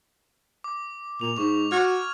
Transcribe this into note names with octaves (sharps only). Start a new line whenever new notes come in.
D6
A#2 F7
G#2 C#6
F#4 F6 G#6